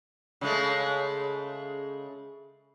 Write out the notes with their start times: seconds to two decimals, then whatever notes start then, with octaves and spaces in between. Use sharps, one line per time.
0.41 C#3 G#3 A3